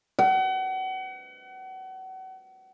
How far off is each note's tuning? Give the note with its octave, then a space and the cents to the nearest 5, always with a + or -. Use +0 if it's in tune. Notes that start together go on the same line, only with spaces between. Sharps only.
F#5 +35